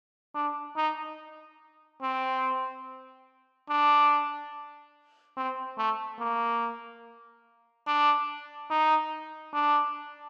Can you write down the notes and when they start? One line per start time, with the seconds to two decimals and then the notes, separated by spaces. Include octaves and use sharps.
0.35 D4
0.76 D#4
2.02 C4
3.70 D4
5.37 C4
5.78 A3
6.19 A#3
7.86 D4
8.70 D#4
9.53 D4